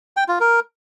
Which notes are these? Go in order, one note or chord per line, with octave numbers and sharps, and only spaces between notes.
G5
F4
A#4